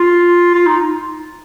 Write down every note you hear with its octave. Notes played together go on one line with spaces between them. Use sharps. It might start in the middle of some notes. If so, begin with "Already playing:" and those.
Already playing: F4
F4
D#4